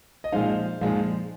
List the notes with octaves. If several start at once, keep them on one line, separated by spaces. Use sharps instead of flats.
D#5
A#2 F3 G#3 D#4 C5 F5
A#2 F3 G#3 D#4